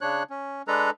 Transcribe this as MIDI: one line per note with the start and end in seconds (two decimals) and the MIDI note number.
0.01 0.23 49
0.01 0.23 62
0.01 0.23 73
0.01 0.23 90
0.30 0.62 61
0.68 0.90 56
0.68 0.90 62
0.68 0.90 69
0.68 0.90 71
0.68 0.90 82